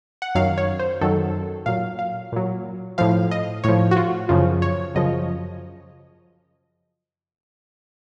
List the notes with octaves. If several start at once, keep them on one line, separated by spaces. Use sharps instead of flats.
F#5
F#2 D#3 F#3 F5
C#5
C5
F#2 D#3 F#3 A4
A#2 F#3 F5
F5
A#2 F#3
A2 F3 F5
D#5
A2 F3 C#5
F#4
F4
F#2 C#3 F3 F4
C#5
F#2 C#3 F3 D#5